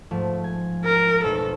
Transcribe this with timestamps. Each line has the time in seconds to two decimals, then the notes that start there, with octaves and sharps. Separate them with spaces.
0.11 G#2 F3 A3
0.44 G#5
0.85 A#4
1.24 F1 B2 A4